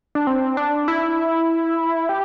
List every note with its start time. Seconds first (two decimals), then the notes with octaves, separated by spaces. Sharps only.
0.15 D4
0.27 C4
0.57 D4
0.88 E4
2.09 G4